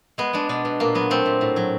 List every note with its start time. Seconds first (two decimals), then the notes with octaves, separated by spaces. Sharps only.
0.18 G#3 B3
0.33 G#3 D4
0.49 B2 D4
0.65 B2
0.80 A#2 A#3
0.95 F#3 B3
1.10 A3 C4
1.26 A#2
1.41 A2
1.56 F#3